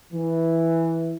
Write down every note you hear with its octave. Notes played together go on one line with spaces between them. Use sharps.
E3